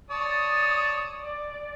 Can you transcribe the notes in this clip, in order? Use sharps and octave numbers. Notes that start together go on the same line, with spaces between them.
C#5 D5 A5 D#6
D5